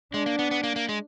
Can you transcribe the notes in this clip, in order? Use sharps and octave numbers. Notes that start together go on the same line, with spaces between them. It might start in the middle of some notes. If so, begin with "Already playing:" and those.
G#3 D4
A#3
B3
B3
A#3
A#3
G#3